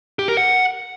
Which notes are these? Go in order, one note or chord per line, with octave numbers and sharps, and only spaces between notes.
G4
A#4
F#5